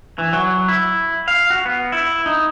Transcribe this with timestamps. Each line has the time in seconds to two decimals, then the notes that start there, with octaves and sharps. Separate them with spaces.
0.18 E3
0.33 F#3
0.68 E4
1.28 F5
1.50 F#4
1.65 B3
1.92 E4
2.26 D#4